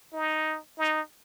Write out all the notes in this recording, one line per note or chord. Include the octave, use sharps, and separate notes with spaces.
D#4
D#4